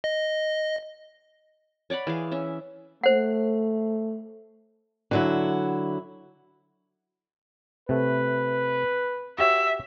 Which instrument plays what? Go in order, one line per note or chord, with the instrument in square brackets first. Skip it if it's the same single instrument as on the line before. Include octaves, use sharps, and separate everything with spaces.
[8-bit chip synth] D#5
[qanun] C#5 D5 F#5 B5
E3 G#4 F5
C#4 E5
[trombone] A3 [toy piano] C5 F#5
[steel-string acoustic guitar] D3 F#3 E4
[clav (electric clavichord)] C3 A3 [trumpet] B4
[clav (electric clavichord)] F#4 G4 C#5 [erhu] E5